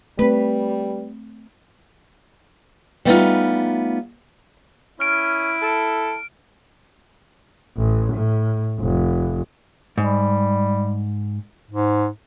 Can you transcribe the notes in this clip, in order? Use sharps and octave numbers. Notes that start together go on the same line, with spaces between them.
G3 A3 C4 B4
G3 A3 B3 C4 D#4 F4
C#4 E4 F6 D7
A4
A1
A2
F1
G#2 G3
G#2